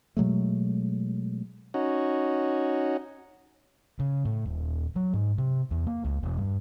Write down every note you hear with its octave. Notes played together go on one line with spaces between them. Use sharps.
B2 F#3 G#3 A3
C#4 D#4 F#4
C#3
A2
D#1
F#3
G#2
C3
E2
A#3
C#2
E1
G2